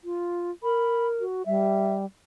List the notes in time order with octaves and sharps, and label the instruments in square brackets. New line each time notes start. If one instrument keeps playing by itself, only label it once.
[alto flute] F4
[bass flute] A#4 [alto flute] B5
[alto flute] F#4
[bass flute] G3 [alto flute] E5